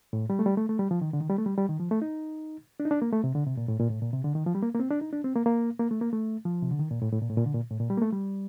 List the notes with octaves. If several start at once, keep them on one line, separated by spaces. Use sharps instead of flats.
A2
G3
A3
G3
A3
A3
G3
F3
D#3
D3
D#3
G3
A3
G3
G3
D#3
F3
A3
D#4
D4
D#4
D4
A#3
A3
C3
D3
C3
A#2
A2
A#2
A2
A#2
C3
D3
D#3
F3
G3
A#3
A#3
C4
D4
D#4
D4
C4
A#3
A#3
A#3
A3
A#3
A3
F3
C3
D3
D#3
A#2
A2
A2
A#2
A2
A#2
D3
A#2
A2
A#2
G3
A#3
A3
G3